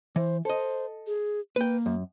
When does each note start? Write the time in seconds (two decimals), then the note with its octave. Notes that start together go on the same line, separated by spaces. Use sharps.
0.16 E3 C5
0.45 A4 C5 D#5
1.07 G#4
1.56 A#3 B4 G5
1.86 F#2